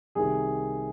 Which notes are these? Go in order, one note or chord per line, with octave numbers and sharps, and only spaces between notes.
C2 C3 D#3 G#4